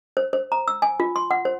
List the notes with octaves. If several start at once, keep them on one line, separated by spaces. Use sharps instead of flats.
C5
C5
A#5
E6
G#5
F4
C6
F#5
C5